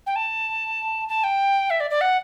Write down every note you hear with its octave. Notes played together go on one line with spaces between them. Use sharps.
G5
A5
A5
G5
E5
D5
D5
F#5